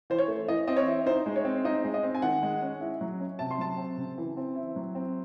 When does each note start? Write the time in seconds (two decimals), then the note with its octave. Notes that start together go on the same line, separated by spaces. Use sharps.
0.10 E3 C5
0.18 C#5
0.28 A3
0.48 E3 D#5
0.68 C4 D#5
0.77 C#5
0.86 E4
1.06 D#4 C5
1.26 G#3
1.36 C#5
1.45 C4
1.65 D#4 D#5
1.84 G#3
1.94 D#5
2.03 C4
2.15 G#5
2.22 D#3 F#5
2.43 G#3
2.62 C#4
2.81 E4
3.01 F#3
3.20 C#4
3.39 C3 A5
3.51 C6
3.58 F#3 A5
3.78 C4
3.98 C#3
4.18 E3
4.37 C4
4.55 E4
4.76 F#3
4.95 C4